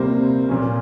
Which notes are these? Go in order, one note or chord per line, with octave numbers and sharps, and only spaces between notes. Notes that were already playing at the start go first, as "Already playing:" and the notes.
Already playing: C3 G3 A#3 C5
A#2 F3 A#3 C#4